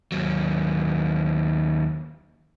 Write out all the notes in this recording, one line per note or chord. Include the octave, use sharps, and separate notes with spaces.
D#2 F#3